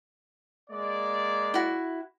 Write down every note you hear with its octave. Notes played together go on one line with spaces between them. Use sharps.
G#3 A#3 D5
E4 F#4